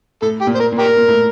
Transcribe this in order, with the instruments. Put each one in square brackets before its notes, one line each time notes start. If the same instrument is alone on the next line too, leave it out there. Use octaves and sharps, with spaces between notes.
[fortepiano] A2 [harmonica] A4
[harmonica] G4
[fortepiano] A#2
[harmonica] C5
A#4
[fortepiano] A#2
[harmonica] G4 A#4
[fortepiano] A#2
A2